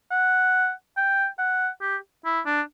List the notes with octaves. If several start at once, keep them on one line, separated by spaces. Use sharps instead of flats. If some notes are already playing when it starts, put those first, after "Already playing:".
F#5
G5
F#5
G4
E4
D4